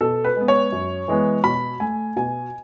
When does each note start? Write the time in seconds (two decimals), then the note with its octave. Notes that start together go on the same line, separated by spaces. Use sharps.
0.01 B2 A4
0.24 B4
0.36 G#3 B3
0.48 C#5
0.72 F#2
1.08 E3 G#3 B3
1.44 B2 B5
1.80 A3 G#5
2.16 B2 G#5